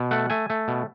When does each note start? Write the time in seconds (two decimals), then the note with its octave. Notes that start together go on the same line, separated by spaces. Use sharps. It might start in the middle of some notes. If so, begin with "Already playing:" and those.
Already playing: B2
0.11 A3 F#5
0.30 A3 G#5
0.50 A3
0.68 B2